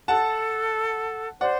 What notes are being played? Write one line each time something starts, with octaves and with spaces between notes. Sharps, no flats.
A4 F#5 A5
C5 D5 F#5